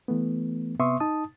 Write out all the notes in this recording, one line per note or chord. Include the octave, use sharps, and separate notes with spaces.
E3 A3 B3
C3 B3 E5 C6 C#6 D#6
D#4 A5 D#6